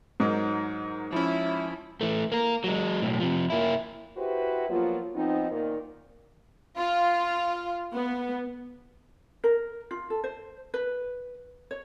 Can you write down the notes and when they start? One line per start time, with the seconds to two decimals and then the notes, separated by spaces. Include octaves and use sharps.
0.20 G#2 F#3 D#4 A#4
1.12 F3 C#4 E4
2.01 E3 A3
2.32 A#3 A#4
2.64 F#3 G#3
3.02 B1 A2
3.20 C3 F3
3.50 A#3 E4
4.17 E4 F#4 G4 B4 C5
4.69 F3 F#3 A#3 B3 F4
5.15 F3 B3 C4 D#4
5.50 A#2 D#3 A#3
6.78 F4
7.93 B3
9.44 A#4
9.91 F4
10.10 A4
10.24 C5
10.74 B4
11.71 C#5